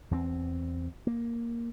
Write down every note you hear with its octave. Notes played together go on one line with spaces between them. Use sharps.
E2 B3 C4
A#3